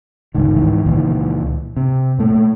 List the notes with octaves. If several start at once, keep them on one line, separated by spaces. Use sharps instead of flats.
G1 C#2 D#3
G#2 D#3 E3
C#2 A#2 D#3 E3
C3
A#2 A3